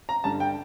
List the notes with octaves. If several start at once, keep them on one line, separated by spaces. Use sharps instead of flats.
A#5
G2 D3 G3 A5
G5